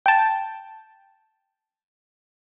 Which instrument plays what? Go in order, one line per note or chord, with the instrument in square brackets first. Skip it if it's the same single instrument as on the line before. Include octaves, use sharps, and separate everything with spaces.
[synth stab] G5 A5